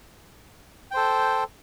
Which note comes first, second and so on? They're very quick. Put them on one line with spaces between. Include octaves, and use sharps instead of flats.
G5 C5 A4